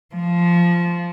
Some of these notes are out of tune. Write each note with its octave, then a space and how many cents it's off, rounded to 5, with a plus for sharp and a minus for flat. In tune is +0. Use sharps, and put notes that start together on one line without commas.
F3 -10